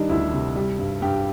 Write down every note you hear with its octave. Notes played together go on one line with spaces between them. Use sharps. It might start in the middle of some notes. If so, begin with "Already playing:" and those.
Already playing: D#3 G3 D4 D#4
D2 E4
C3
G3
G2
G2 G4